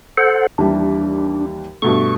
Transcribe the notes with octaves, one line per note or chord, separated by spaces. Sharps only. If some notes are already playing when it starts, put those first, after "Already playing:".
A4 C5 F#5
D#2 E3 G3 D4
G2 B2 A3 C#6